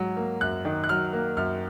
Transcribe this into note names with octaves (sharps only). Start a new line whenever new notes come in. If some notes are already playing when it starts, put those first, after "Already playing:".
Already playing: G#2 F#3
A#3
F#2 F#6
D#3
F#6
F#3 F6
A#3
F#2 F6